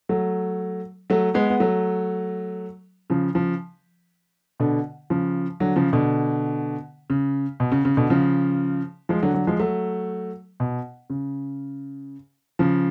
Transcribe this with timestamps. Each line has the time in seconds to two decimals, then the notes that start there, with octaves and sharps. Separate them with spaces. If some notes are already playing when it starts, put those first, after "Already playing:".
0.09 F#3 A3
1.10 F#3 A3
1.34 G#3 B3
1.50 B3
1.60 F#3 A3
3.10 C#3 F3
3.35 C#3 F3
4.60 B2 D3
5.10 C#3 F3
5.60 D3 F#3
5.76 C#3 F3
5.93 B2 D3
7.10 C#3
7.60 B2
7.72 C#3
7.85 C#3
7.97 B2 D3
8.10 C#3 F3
9.09 F3 G#3
9.22 D3 F#3
9.34 D3 F#3
9.47 F3 G#3
9.60 F#3 A3
10.60 B2
11.10 C#3
12.59 C#3 F3